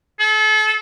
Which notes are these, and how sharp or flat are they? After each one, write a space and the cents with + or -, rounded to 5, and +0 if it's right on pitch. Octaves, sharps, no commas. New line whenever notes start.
A4 -35